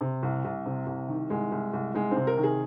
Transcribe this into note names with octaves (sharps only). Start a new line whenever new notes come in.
C3
C2
C2
C3
C2
D#3
C2 G#3
C2
C2
C2 G#3
C4
C3
A#4
D#3
G#4